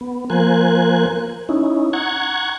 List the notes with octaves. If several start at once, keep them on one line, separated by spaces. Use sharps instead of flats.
B3
F3 A#3 A#4 C5 G#5 F#6
C#4 D#4 E4
F#5 A#5 C#6 F#6 G#6